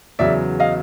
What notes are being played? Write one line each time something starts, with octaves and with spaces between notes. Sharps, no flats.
E2 C#3 F#3 D5 E5
D#5 F5